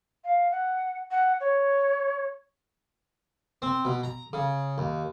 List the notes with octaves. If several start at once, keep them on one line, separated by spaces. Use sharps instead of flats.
F5
F#5
F#5
C#5
C4
B2
A#5
C#3
D#2